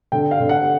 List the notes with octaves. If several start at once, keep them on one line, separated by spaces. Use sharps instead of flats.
D3 G5
F5
D3
F#5